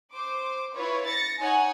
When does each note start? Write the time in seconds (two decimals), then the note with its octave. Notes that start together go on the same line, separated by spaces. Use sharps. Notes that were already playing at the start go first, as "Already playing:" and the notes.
0.13 C5 D6
0.75 E4 F4 B4 C#5
1.06 A6 A#6 C#7
1.41 D#4 C#5 F#5 G#5